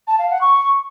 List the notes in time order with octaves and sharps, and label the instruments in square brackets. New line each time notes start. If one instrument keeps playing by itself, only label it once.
[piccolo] A5
F5
F#5
C#6